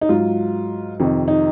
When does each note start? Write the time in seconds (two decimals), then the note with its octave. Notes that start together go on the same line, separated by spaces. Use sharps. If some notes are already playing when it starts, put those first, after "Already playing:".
0.01 D#4
0.09 G#2 F#3 F4
1.00 F2 C3 D#3 D#4
1.28 D#4